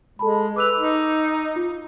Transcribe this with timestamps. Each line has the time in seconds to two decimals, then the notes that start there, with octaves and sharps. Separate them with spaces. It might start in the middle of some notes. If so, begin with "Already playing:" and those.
0.19 G#3 A4 A5 B5
0.56 B4 D6 E6 F7
0.76 D#4
1.56 F4